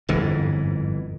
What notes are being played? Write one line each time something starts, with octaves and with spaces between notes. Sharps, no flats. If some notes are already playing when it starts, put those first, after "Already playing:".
G1 F2 G#2 E3